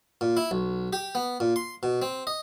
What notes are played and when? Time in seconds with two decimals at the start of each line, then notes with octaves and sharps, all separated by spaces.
0.21 A#2
0.37 E4
0.51 B1
0.93 G4
1.15 B3
1.40 A#2
1.56 C6
1.83 B2
2.02 C4
2.27 D#5